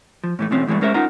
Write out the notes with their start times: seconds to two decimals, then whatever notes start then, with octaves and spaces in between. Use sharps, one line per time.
0.24 F3
0.39 A2 E3 A3
0.51 B2 E3 A3 C4 C#4
0.67 E2 G2 E3 G#3 A3
0.81 G#3 C#4 A#4 C5 E5
0.94 C#4 D#4 F4 A#4 F#5 A#5